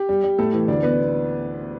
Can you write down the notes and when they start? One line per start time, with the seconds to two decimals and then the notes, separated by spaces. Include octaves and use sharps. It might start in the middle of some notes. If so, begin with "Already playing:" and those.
Already playing: G4
0.09 G3
0.24 G3
0.38 A2 A3 A4
0.53 E3
0.68 D2 D4 D5
0.83 B3 B4